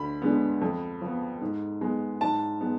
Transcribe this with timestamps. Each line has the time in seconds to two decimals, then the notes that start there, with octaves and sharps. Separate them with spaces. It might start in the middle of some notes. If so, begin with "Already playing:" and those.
Already playing: D2 B5
0.22 D3 G#3 B3
0.61 F2
1.01 F3 B3
1.41 G#2
1.81 G#3 B3
2.21 G#2 A5
2.61 G#3 B3